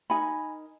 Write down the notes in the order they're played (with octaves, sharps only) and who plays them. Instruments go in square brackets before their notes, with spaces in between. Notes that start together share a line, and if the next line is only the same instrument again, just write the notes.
[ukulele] D#4 A#4 G#5 B5